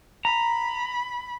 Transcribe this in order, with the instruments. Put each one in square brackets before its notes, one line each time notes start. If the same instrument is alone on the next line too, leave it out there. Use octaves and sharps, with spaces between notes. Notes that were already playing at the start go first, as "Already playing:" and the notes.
[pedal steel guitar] A#5 [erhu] B5